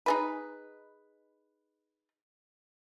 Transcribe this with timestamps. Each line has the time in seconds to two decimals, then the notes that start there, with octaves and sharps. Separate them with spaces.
0.06 D#4 G#4 B4